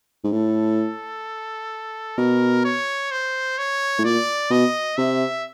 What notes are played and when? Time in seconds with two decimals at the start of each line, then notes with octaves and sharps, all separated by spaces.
0.24 G#2
0.32 A2 A4
2.18 B2 A#4
2.65 C#5
3.11 C5
3.58 C#5
3.99 A2
4.05 A#2 D5
4.51 B2 D#5
4.97 C3 E5